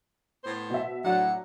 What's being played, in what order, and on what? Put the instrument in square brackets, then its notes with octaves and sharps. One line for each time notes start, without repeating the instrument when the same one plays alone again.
[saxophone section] A2 B3 C5
[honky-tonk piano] B2 E5
[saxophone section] A2 A3 F#5 [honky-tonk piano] F#3 D4